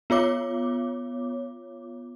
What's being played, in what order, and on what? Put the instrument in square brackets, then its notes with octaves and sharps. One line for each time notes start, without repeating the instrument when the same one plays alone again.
[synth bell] B3 F4 C#5 D6